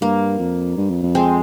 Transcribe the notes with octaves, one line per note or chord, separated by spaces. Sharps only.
G2 A#3
F2
G2
F2
F2
G#3 C4